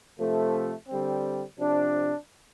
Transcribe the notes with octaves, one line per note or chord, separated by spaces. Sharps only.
C3 F3 A3
D3 G3 C4
C3 F3 D4